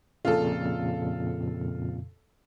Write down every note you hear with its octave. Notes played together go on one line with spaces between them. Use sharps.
F2 A#2 C#3 F4 A4